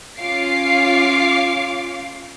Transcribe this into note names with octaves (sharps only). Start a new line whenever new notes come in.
C#4 F4 F5 D6 C7